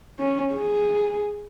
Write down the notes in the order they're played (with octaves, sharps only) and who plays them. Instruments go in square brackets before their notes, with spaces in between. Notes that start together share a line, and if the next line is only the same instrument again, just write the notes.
[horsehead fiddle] C#4
G#4